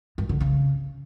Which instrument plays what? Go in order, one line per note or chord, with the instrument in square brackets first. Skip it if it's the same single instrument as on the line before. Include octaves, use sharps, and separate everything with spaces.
[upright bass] G2
D3
C#3